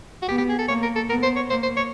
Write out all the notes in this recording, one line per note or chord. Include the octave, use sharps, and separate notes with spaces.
F#4
B3 G4
G4
G#4
A4
A#3 C#5
A#4
A4
B3 A#4
C5
C#5
A#3 C5
C5
C#5